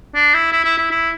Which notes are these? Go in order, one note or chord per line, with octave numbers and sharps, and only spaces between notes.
D4
E4
E4
E4
E4
E4